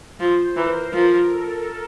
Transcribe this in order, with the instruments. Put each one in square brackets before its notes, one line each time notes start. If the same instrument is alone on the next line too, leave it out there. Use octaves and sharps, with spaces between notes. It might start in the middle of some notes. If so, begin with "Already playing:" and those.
[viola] F3 [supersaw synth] C5
[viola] E3 [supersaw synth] A#4
[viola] F3
[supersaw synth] A4